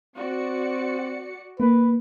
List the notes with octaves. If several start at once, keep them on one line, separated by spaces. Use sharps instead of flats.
C4 F#4 D5 C#7
A#3 B4